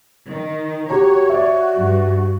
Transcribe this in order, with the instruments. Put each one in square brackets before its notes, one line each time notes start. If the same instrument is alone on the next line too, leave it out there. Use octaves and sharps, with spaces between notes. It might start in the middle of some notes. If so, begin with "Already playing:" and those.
[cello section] D#3
[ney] F#4 [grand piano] G4 A#5 [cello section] C#5
[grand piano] D5 E5
[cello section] G2